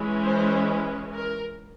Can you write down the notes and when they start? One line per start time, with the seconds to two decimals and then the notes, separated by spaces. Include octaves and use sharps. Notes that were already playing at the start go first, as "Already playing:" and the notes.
Already playing: E3 G#3 C#4
0.24 C5
1.13 A#4